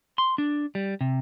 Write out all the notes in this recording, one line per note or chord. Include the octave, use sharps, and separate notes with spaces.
C6
D4
G3
C3